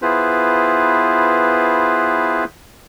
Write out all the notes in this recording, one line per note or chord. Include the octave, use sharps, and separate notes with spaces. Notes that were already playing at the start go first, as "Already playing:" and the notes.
B3 E4 F4 G#4 B4 C5